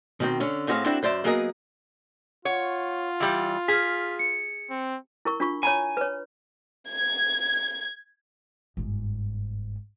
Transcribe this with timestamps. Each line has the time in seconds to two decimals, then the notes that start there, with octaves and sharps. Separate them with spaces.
0.20 B2 D#3 C4
0.40 D3 C#4
0.68 A2 C4 F#4 G#4 E5 F5
0.86 C4 D4 E4 F#4 A4
1.03 F#2 C5 D5 E5
1.24 F#3 A#3 B3 G#4 A#4 D#5
2.45 F4 C#5 F#5
3.20 E3 G3
3.68 G#4 F6 B6
4.19 C#7
4.70 C4
5.25 E4 A#4 C#6
5.40 D4 F4 C#6
5.63 C#5 G#5 A#5 B5
5.97 B4 C#5
6.89 G#6
8.77 G1 G#2